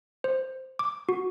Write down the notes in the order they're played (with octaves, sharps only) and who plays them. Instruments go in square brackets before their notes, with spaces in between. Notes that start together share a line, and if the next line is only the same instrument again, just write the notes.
[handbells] C5
D6
F#4